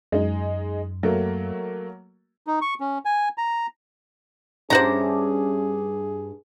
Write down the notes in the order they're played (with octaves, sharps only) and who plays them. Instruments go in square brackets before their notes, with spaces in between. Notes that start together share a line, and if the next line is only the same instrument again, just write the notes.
[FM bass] F#2 [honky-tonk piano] G#3 D#4
[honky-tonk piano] F#3 A3 A#3
[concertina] D#4
C#6
C#4
G#5
A#5
[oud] G2 D4 E4 [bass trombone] C#4 [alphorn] G#4 [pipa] C5 F#5 A#5